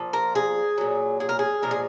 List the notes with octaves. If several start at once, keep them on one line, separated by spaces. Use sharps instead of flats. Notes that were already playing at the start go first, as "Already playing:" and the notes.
Already playing: A#2 F3
A#4
G#4
A#2 F#3
G#4
A#4
G#4
A#2 F3 G#3 A#4
G#4